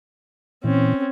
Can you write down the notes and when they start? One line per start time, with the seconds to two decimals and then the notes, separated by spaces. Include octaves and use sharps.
0.64 A#2 E3 C4 C#4